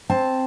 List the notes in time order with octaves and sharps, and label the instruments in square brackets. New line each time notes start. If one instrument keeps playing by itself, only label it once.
[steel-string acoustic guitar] C4 A5